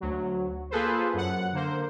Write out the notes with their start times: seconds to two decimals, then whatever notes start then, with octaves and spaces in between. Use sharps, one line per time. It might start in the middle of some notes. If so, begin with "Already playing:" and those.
0.01 D2 F#3
0.70 A#3 F4 G#4 A4 B4 C5
1.14 F#2 F#5
1.53 D3 A#3 C5